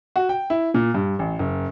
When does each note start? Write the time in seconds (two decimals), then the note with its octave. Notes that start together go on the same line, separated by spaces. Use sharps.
0.16 F#4
0.29 G5
0.50 E4
0.74 A#2
0.94 G2
1.19 A1
1.39 F#1